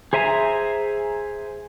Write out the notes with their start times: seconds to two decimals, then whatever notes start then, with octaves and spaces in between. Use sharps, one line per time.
0.13 G#4 C5 E5 G#5 A#5